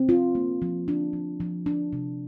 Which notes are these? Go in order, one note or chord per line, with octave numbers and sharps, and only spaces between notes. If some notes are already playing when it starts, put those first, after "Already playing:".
Already playing: C4
F4
A#3
F3
D4
F3
F3
D4
C3